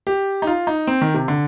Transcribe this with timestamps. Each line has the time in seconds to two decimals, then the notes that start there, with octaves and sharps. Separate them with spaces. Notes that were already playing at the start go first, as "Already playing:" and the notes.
0.07 G4
0.42 D#4
0.47 F4
0.67 D#4
0.87 C4
1.01 D#3
1.14 C3
1.28 D3